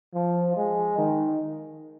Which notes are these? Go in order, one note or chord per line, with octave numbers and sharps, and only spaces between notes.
F3
G#3
D#3